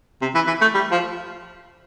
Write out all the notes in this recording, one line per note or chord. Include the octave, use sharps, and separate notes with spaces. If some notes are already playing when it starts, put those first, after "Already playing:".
C3
E3
E3
A3
G3
F3